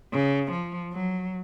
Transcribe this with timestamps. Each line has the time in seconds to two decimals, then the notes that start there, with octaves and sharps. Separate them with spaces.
0.13 C#3
0.52 F3
0.93 F#3